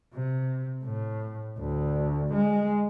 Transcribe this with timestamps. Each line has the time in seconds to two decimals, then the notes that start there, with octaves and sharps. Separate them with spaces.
0.14 C3
0.85 A2
1.59 D2
2.34 G#3